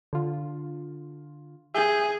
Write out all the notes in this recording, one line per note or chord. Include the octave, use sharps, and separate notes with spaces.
D3 F4
G#4 E5 G6